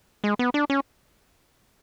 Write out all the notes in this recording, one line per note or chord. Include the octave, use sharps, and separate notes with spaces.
G#3
B3
D4
C#4